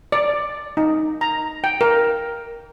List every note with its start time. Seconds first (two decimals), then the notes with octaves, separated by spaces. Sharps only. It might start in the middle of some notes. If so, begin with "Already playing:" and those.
0.12 D5
0.77 D#4
1.21 A#5
1.64 G5
1.81 A#4